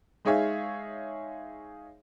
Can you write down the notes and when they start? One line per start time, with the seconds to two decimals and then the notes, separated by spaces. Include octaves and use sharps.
0.25 G#3 D#4 G#4 C#5 E5 F5